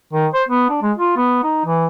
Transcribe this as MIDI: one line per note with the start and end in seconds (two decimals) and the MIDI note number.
0.13 0.27 51
0.34 0.43 72
0.49 0.66 59
0.70 0.79 62
0.82 0.92 56
0.98 1.15 65
1.17 1.39 59
1.44 1.63 63
1.66 1.87 52